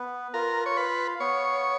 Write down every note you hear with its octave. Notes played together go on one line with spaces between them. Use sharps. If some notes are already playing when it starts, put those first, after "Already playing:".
Already playing: B3 B4
F4 A#4
C#5
B4 F5
B3 C#5